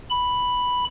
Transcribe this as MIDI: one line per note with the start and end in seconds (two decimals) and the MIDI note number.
0.10 0.85 83